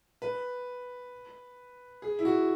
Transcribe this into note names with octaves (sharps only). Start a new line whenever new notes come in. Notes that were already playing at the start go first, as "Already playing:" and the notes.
B4
G#4
E4
F#4